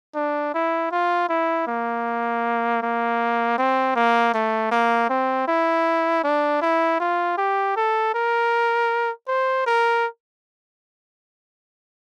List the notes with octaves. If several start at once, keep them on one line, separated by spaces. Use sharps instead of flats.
D4
E4
F4
E4
A#3
A#3
C4
A#3
A3
A#3
C4
E4
D4
E4
F4
G4
A4
A#4
C5
A#4